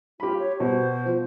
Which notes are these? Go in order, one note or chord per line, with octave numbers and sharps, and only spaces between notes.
F4 G4 B5
C#5
B2 C5
F3